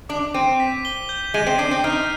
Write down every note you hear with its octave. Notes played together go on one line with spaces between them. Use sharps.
D4 D6
C4 D#7
B6
G7
G6
G#3 D#7
C4
D4 C7
C4
D#4 F6